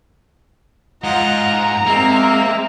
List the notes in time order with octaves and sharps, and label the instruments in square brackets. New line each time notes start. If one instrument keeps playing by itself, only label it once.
[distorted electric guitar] G#2 [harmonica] F4 D#5 F#5 [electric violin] A#5
[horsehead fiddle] G#3 C4 [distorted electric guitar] A#3 [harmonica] E5